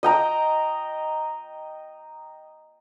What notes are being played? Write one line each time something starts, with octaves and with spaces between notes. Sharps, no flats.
D#5 G5 A#5